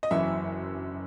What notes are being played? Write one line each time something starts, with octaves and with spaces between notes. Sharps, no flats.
D#5
F#1 F#2 E3 E5